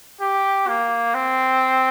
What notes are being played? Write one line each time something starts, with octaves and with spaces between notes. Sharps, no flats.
G4
A#3
C4